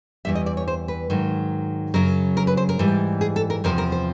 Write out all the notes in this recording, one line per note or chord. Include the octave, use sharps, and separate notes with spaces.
E2 C3 E3 G3 E5
D#5
D5
C#5
C5
B4
G#2 D#3 F#3
F#2 C#3 F#3 A#4
A#4
B4
C5
A#4
G#2 E3 G3
G#4
A4
A#4
E2 C3 F3 A#4
A#4
C5